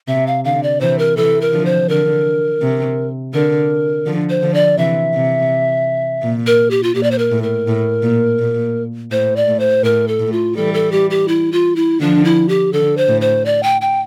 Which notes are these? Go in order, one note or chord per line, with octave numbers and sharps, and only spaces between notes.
C3 E5
F5
D3 F5
D5
C3 E3 C5
A#4
C3 E3 A4
A#4
D3 F3
C5
D3 A#4
C3
D3 A#4
D3 F3
C5
D3 F3
D5
C3 E3 E5
C3
A#2
A#4
G4
F4
A#2 G4
D5
C5
A#4
A2
A#4
A2
A#2
A#2
A2 C5
D5
A2
C5
A2 A#4
A4
A2
F4
E3 G3 A4
A4
G4
G4
E4
F4
E4
D3 F3 D4
E4
G4
D3 A4
C5
A2
C5
D5
G5
G5